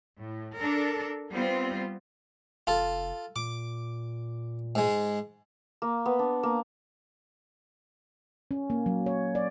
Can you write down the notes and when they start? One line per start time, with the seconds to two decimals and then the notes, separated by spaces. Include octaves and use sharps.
0.21 A2
0.57 D4 A4 A#4
1.32 G3 B3 C4 F4 C5
2.67 F1 F4 A4
3.36 A#2 D6
4.75 G#2 G#3
5.82 A#3
6.06 B3
6.19 D4
6.43 A#3
8.51 C#4
8.70 A#3
8.86 F#3
9.06 C#5
9.35 D5